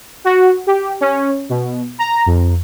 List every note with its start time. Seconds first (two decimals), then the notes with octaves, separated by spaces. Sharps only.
0.24 F#4
0.67 G4
1.01 C#4
1.49 B2
1.99 A#5
2.26 F2